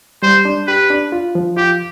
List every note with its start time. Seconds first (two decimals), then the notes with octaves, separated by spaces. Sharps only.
0.23 G3 C5
0.45 D4
0.68 G4 B4
0.90 D4
1.12 F4
1.35 F3
1.57 F4 G4